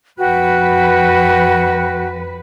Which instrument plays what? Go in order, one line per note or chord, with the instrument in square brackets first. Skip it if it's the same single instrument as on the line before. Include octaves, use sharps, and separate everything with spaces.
[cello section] F2 B4 [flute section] F#4 G5 F#6